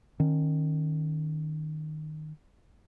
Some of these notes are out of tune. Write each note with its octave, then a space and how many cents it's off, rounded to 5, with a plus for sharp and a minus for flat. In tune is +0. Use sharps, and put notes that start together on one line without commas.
D#3 -10 C#4 -20